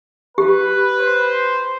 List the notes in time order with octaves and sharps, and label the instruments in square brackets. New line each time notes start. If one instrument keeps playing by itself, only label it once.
[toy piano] G4 [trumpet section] B4
[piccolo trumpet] C5